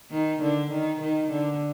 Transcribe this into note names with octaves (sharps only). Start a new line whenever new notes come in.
D#3
D3
D#3
D#3
D3